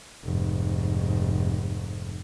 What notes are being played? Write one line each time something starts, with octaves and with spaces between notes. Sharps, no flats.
F1 G#2